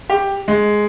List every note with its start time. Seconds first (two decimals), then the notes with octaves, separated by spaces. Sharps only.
0.09 G4
0.48 G#3